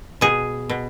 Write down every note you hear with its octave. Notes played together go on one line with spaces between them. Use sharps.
B2 G#4
B2